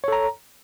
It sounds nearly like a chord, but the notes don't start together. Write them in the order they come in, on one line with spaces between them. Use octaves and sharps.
C#5 A4 A#5